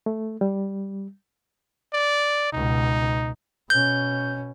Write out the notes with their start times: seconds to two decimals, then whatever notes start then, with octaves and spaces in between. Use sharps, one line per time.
0.06 A3
0.41 G3
1.94 D5
2.53 C#2 B2 D#4
3.70 B2 C#4 G6